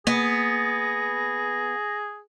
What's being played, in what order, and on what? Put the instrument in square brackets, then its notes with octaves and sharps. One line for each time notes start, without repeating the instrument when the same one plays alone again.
[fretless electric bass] A#3 [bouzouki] B3 [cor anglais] G#4 [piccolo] A#6